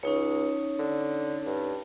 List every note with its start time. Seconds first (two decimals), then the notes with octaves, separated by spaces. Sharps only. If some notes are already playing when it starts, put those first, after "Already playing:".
0.03 C#2 C#4 D#4 C#5
0.79 D3
1.46 G2